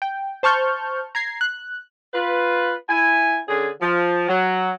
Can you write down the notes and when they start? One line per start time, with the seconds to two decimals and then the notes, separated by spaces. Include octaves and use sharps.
0.02 G5
0.43 C5 A5 C#6 F6 G6
1.15 A#5 G#6 C7
1.41 F#6
2.14 F4 B4
2.89 E4 G#5
3.48 D3 C#4 G#4
3.81 F3
4.29 F#3